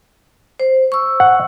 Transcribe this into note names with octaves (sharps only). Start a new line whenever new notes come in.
C5
C#6 E6
F#5